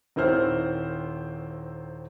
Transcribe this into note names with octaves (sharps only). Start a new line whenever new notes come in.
D#1 D#3 C4 E4 C5 F6